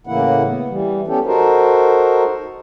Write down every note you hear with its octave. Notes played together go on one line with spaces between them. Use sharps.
A2 C#3 E3 A#3 E4 F#5
B3
E3 G3
B3 C#4 G4 A4
D#4 F#4 A4 A#4 C5